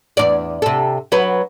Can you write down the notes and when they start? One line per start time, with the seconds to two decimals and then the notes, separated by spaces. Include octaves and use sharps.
0.17 E2 C3 D5
0.62 C3 A4
1.12 F#3 B4